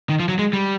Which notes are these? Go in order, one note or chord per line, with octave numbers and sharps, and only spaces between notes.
D#3
F3
F#3
G#3
G3